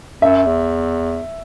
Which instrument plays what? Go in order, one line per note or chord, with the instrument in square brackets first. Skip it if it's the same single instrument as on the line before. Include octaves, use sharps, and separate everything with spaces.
[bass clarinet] F#2 [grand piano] E5
[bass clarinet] E2